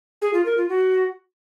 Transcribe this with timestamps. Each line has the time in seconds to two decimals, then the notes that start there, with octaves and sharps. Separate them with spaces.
0.22 G#4
0.34 F4
0.45 A#4
0.57 F4
0.69 F#4